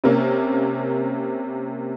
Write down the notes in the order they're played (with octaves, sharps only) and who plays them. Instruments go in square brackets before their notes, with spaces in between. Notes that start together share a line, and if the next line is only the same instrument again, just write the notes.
[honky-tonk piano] C3 A#3 C#4